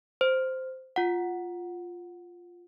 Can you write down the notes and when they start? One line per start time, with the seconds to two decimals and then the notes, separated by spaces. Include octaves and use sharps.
0.21 C5
0.96 F4 F#5